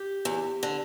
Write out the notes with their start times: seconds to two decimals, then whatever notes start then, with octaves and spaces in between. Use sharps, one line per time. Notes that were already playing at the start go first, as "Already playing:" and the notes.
Already playing: G4
0.25 E2
0.63 D3